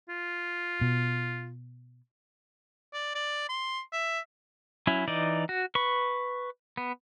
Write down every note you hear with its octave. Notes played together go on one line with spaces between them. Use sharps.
F4
B2
D5
D5
C6
E5
F#3 C#4 E4
E3 D#4 D5
F#4
B4 C#6
B3